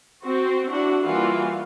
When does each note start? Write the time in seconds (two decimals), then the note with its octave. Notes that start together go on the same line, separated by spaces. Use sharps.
0.24 C4 F#4
0.70 D4 E4 F#4 F#5
1.03 E3 G3 A#3 F4 F#4